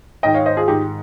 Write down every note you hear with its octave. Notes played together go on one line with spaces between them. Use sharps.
G#2 D#3 D#5 G5
C#5 F5
C5 D#5
F4 G#4
G#2 D#3 D#4 G4